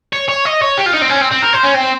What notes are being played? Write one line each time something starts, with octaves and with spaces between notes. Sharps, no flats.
C#5
C#5
D#5
C#5
G4
F4
D#4
C4
C#4
C4
C4
A#4
C5
C#4
C4